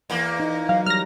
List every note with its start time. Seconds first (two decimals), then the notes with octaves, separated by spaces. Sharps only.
0.10 E2 A#3
0.40 D#4
0.69 F#3 F5
0.86 G3 F6 A#6